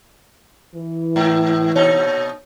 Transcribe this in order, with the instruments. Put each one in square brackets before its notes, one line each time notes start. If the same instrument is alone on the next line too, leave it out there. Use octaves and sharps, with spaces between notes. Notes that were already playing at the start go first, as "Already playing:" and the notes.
[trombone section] E3
[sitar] G#2
[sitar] A#2 D#4 [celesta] C#5